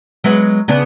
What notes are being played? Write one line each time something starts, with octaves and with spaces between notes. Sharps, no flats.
F#3 G#3 B3
C#3 B3 D4